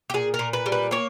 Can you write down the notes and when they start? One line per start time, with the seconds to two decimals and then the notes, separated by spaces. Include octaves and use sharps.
0.10 G4
0.14 A#2 G#4
0.34 A#4
0.39 A#2
0.53 B4
0.66 G3
0.72 B4
0.91 A#3 C#5